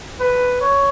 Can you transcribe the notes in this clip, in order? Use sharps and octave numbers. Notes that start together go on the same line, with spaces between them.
B4
C#5